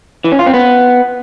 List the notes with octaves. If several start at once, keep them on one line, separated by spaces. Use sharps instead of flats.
E3
C#4
F4
C4
B3